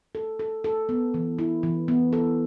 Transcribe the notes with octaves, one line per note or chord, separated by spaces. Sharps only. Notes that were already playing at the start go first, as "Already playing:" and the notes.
A4
A4
A4
B3
E3
E4
E3
B3
A4